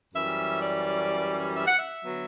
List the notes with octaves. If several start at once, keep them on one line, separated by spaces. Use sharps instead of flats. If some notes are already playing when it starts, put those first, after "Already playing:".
F#2 E3 G3 C#4 E5
D5
E5
F#5
E5
D3 F#3 B3